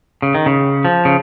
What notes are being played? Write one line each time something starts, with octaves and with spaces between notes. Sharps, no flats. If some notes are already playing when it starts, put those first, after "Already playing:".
C#3
D#3
C#3
F3
C#3